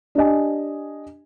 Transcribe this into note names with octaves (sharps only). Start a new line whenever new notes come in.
D4 G4 D#5 G#5